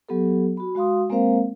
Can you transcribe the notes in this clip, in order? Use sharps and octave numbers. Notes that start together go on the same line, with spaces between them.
F#3 B3 G4 A4
F#4 B5
G#3 F#4 F5 C6 D#6
G#3 A#3 C4 A#4 C5 F5